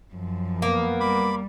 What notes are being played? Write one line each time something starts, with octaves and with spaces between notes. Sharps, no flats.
F#2 F3
A#3 B3 A#4
G3 B5 D6